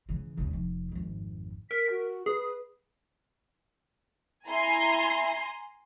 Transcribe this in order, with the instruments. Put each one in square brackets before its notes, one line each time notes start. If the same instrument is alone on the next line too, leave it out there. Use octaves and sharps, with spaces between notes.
[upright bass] C#3 E3
D#2 C#3
F1 F3
G#1 F2
[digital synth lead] A#4 [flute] B6
[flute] F#4
[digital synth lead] G#4 [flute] B4
[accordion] E4 [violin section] G#5 A#5 C6